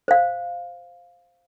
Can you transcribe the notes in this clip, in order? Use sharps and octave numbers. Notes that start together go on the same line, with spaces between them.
C5 F5